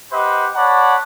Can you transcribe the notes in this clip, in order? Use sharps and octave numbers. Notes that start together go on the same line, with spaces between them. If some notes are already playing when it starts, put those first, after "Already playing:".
G4 B4 C5 D#5 F#5
C#5 D5 F#5 A5 B5